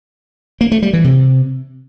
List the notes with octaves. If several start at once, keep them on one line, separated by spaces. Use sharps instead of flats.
A#3
A3
G3
E3
C3